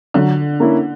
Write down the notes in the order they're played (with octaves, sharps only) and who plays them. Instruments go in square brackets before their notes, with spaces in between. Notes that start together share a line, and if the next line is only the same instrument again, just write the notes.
[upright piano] D3 [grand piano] F#3
[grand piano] A#3 C#4 E4